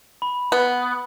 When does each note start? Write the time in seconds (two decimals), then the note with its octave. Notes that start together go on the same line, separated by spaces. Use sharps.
0.22 B5
0.52 B3